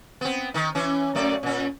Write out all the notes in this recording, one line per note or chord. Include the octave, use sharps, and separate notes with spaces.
B3 C4
D#3 D#4
E3 C#4
F#2 A3 D5
A#2 C#4